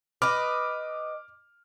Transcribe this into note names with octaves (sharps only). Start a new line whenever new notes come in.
B4 D#5 D6 F6